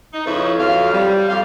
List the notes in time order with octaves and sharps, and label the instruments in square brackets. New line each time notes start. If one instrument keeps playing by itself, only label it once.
[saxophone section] D#4
F2 C#3 E4 B4 C#5
F2 F#3 F5
G3
F2 G4 F5